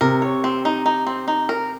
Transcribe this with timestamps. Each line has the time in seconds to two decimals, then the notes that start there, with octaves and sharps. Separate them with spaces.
0.01 C3 A#4
0.22 C#5
0.44 C4
0.65 D#4
0.86 D#4
1.07 C4
1.28 D#4
1.49 A#4